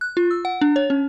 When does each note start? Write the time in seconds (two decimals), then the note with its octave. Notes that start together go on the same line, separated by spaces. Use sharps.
0.01 F#6
0.17 F4
0.31 E6
0.45 F#5
0.61 D4
0.76 C#5
0.90 C#4